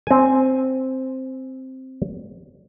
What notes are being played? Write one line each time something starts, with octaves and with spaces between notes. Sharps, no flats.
C4 G#5